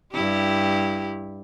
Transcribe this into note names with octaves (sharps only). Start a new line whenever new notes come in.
G2 E4 G4